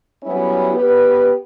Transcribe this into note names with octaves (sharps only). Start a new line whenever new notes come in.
F#3 G3 B3 C#4 E4
B3 G4 B4